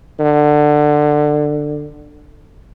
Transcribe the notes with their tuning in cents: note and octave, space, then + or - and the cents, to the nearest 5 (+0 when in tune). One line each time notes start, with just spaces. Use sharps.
D3 +20